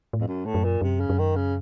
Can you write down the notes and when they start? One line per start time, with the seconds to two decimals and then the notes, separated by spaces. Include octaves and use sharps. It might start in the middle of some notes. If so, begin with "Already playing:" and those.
0.13 A2
0.20 F2
0.27 F#2
0.45 A2
0.54 F#2
0.64 A#2
0.81 F#2 C3
1.00 C#3
1.09 F#2
1.19 D#3
1.36 C#3